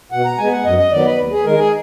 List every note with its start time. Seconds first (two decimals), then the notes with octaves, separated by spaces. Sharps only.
0.12 B2 F#5
0.25 A#5
0.38 G#3 B3 G#5
0.52 F#5
0.65 F#2 D#5
0.78 D#5
0.91 D#3 F#3 B3 D5
1.05 B4
1.19 D#2
1.31 G#4
1.45 D#3 G#3 A#4
1.58 G#4